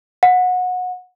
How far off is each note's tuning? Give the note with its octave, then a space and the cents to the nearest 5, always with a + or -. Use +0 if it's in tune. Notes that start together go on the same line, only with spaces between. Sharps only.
F#5 -25